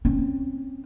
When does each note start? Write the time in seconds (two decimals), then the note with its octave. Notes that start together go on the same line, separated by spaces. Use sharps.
0.05 C4 C#4